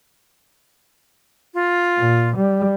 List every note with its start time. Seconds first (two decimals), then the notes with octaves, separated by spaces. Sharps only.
1.54 F4
1.97 A#2
2.37 G3